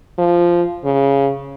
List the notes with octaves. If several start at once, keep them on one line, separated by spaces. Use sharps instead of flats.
F3
C#3